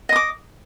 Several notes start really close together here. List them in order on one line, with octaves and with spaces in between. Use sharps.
D#5 D#6 D6